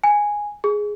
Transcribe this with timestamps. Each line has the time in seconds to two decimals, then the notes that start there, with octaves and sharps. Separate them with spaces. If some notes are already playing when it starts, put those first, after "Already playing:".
0.04 G#5
0.64 G#4